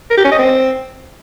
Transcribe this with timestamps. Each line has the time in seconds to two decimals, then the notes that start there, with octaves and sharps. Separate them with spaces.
0.10 A#4
0.17 G4
0.24 C#4
0.31 D#5
0.38 C4